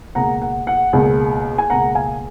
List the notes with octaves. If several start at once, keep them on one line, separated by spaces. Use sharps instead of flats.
C#2 B2 A#3 F#5 A#5
F#5
F#5
C#2 B2 A#3
G#5
C#2 B2 A#3 F#5 A#5
F5 G#5